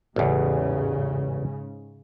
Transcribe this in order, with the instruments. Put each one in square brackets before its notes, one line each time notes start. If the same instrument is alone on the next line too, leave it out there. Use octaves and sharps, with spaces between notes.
[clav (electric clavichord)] A1 E2 [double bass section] G#2 C#3